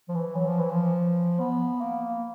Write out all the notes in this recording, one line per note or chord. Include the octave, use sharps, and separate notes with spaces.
F3
E3
F#3
F3
E3
F3
B3
A#3